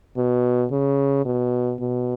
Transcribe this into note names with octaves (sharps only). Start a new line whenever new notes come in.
B2
C#3
B2
B2